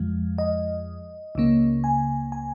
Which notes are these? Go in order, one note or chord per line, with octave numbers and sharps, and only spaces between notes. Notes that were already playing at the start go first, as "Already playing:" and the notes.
Already playing: F2 F3 G#3
D#5
C#2 C#3 A#3
G#5
G#5